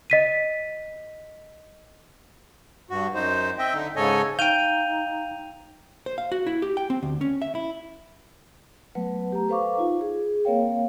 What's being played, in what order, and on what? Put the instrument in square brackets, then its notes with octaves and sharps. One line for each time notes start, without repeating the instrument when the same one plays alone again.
[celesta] D#5 B6 D#7
[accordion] G2 F#4
F#2 D#4 C5
C4 D#5 E5 G5
D3 D#4
G#2 C#3 A4 C#5 D#5 G#5
[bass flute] D#4 [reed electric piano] F5 [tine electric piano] G5 G6 [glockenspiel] D#7 F7
[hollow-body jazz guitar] C5
F5
F#4
E4
G4
G5
C4
D2
C#4
E5
E4
[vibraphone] F#3 A3 B3 B4 F#5
G4 A#5
A4 B4 C5 F5 C#6 D6
D#4 F4
G#4
A#3 C4 A#4 C#5 F5 G5